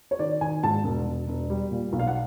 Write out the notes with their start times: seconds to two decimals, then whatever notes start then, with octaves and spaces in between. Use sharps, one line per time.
0.11 C#5
0.19 D#3 D5
0.41 D#3 G#5
0.63 G#2 A5
0.84 E1
1.06 E1
1.28 E1
1.50 G3
1.71 A#2
1.93 B1
1.99 F5
2.07 F#5